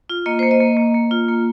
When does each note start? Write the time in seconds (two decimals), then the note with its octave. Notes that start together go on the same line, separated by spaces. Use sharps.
0.10 F4
0.26 A#3 D#5
0.39 A#3 C5
0.51 D#5
0.60 A#3
0.77 A#3
0.94 A#3
1.11 F4
1.28 A#3